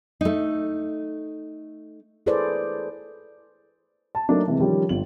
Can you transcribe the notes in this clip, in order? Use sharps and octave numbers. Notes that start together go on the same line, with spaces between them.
A3 D#4
E4 G#4 A4 B4 C5 D5
A5
F#3 A3 A#3 D4 D#4
C3 E3 G#3
D#3 F3 G3 C#4 G4
G1 F4 F#7